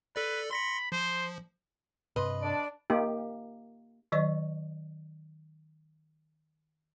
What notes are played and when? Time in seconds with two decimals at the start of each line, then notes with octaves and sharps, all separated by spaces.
0.16 A4 B4 D5
0.51 B5 C6 A#6 C#7
0.92 F3 C5
2.16 G2 C3 B4 D#5 C6
2.42 D4 D5
2.90 A#3 D#4 G4
4.12 D#3 F#3 D5 D#5 C#6